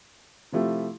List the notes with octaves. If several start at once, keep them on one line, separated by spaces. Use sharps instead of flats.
C3 F3 A3 E4 G4